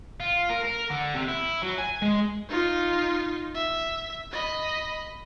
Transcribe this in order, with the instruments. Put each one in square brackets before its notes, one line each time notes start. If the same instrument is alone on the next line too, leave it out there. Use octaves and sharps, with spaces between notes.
[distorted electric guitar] F4
A#4
A#4
D3
C3
E4
F#3
G#5
G#3
[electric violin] D#4 F4
E5
D#5 B5